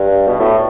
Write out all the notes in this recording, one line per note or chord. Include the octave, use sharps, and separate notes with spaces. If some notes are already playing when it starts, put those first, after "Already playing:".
Already playing: G2
B2
A2